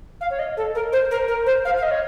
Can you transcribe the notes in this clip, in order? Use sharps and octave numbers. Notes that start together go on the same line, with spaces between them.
F5
C#5
D#5
A4
A#4
C5
A#4
A#4
C5
F5
F5
D#5
C#5